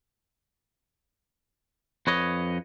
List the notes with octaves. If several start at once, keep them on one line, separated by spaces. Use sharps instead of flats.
F2 B4 C#5 D#5